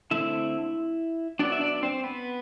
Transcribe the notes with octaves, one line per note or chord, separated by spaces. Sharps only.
D3 A3 C4 E4 E5
F#3 B3 D4 D5
E5
D4 D5
C4 C5
B3 B4